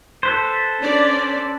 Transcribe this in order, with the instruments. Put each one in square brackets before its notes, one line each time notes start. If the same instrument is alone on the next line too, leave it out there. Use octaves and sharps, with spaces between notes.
[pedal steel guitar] A4 B4 C5
[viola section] C#4 D4 D5